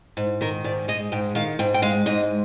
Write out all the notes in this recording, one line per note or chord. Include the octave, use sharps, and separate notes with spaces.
G#2
D#3 A#4
G#2 D5
G#3 D#5
G#2 G5
D#3 F5
G#2 G5
G5
G#3 F5
G#2 D#5